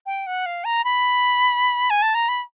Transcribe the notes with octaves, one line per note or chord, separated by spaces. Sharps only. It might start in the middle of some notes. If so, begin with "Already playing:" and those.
G5
F#5
F5
A#5
B5
G#5
A5
A#5
B5